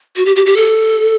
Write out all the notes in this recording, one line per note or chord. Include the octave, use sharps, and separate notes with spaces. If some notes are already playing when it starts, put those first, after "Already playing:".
F#4
G4
G4
G4
A4